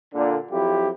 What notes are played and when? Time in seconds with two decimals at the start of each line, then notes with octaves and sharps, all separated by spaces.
0.13 A#2 D3
0.51 F2 F#3 E4 G4